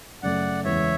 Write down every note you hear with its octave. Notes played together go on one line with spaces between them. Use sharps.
F#2 C#3 F#3 A3 D5 F#5
E2 C#3 G#3 B3 E4 C#5 E5